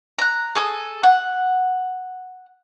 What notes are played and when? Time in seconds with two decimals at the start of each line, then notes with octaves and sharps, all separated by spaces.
0.19 A#5 F#6
0.55 G#4 A4 D#6
1.03 F#5